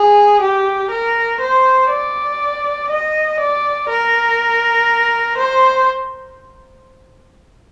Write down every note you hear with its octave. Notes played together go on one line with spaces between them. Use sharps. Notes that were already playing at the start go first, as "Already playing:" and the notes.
Already playing: G#4
G4
A#4
C5
D5
D#5
D5
A#4
C5